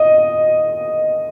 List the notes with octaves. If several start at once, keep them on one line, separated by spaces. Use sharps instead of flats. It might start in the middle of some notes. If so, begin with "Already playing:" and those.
Already playing: D#5